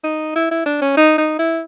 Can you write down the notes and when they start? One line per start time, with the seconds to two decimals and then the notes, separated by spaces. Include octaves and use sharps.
0.04 D#4
0.36 E4
0.51 E4
0.66 D4
0.81 C#4
0.97 D#4
1.18 D#4
1.39 E4